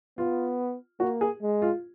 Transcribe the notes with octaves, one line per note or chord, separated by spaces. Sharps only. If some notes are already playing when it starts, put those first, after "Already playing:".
B3 F4
A#3 F#4
G#4
G#3
F4